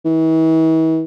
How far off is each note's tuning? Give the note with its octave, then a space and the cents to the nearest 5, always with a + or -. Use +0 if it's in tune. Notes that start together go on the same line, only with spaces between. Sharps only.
E3 -40